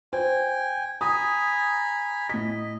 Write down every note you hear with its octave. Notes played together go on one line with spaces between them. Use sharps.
C5 G5 G#5
G#5 A#5 B5 D#6
A2 D#5 B6